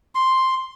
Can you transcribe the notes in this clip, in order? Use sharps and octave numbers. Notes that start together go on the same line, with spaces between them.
C6